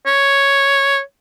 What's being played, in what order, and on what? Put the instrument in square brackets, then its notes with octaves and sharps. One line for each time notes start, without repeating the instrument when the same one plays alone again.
[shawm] C#5